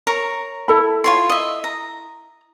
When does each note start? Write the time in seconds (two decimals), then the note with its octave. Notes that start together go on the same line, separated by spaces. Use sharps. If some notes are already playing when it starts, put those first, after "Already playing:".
0.07 A#4 C#5 A#5
0.68 E4 A4 B5
1.04 F4 C#5 C6
1.29 D#5 E5
1.64 A#5